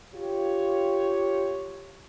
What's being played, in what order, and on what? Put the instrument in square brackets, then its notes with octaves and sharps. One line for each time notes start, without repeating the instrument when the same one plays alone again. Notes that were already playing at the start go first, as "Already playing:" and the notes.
[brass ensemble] F4 G4 C#5